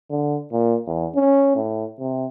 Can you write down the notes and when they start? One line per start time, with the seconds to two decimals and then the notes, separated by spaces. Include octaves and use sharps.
0.11 D3
0.52 A#2
0.87 E2
1.16 C#4
1.56 A2
2.00 C3